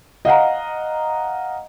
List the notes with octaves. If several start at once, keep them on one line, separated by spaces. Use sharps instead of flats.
D#5 F5 F#5 A#5